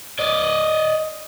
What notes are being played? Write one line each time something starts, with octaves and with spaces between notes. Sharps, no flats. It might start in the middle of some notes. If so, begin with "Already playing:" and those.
D5 D#5